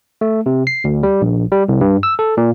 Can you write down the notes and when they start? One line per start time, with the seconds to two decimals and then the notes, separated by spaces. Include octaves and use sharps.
0.21 A3
0.46 C3
0.67 C7
0.84 D2
1.03 G3
1.21 A#1
1.52 G3
1.69 C2
1.81 G2
2.03 E6
2.19 A4
2.37 A#2